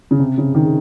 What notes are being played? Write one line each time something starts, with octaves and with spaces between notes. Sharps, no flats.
C#3
C3
C#3
D#3